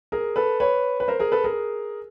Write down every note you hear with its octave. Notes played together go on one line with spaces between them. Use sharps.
G#4 A#4
A4 B4
B4 C#5
B4
A#4 C5
G#4 A#4
A4 B4
G#4 A#4